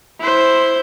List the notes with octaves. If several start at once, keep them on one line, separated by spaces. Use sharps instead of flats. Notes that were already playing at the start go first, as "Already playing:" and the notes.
E4 C5